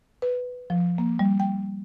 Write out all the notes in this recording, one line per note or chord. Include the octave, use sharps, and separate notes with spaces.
B4
F3
A#3
G3
G5